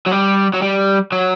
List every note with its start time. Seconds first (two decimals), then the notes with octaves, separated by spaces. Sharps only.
0.06 F#3
0.11 G3
0.54 F#3
0.62 G3
1.12 F#3